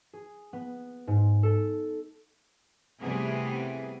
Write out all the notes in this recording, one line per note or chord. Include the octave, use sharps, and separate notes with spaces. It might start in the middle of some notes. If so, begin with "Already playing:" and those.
G#4
B3
G#2
A4
C3 E3 G3 A3 B3 G#4